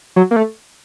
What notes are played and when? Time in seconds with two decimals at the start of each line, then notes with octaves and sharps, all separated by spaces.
0.16 F#3
0.31 A#3
0.36 A3